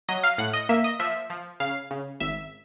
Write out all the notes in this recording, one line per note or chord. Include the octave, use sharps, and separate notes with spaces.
F#3 D#5
F5
A2 F#5
D#5
A#3 E5
D#5
F3 E5
F3
C#3 F5
C#3
G#1 E5